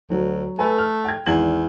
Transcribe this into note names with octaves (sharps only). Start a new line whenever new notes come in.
D2 F#3
A3 A4 B4 G#5
F6
G5 G#6
G#1 E2 G#6 F#7